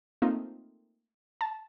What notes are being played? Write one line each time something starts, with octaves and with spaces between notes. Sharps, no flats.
A3 A#3 C4 D#4 F4
A5